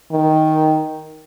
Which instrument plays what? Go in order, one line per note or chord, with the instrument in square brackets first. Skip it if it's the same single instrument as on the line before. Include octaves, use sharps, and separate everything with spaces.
[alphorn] D#3